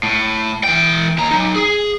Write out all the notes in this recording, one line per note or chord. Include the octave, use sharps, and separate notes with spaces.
A2
E3 G5
D#2 A#5
F#3 D#4
G#4